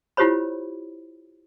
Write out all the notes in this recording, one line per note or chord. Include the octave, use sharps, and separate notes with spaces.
E4 F4 G4 C5 C#5 B5